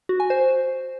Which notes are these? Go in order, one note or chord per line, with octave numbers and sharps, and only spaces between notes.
F#4
G#5
C5